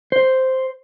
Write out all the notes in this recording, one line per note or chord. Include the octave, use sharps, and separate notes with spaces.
C5